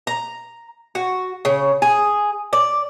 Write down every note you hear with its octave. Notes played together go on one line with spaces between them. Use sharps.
A#5
F#4
C#3
G#4
D5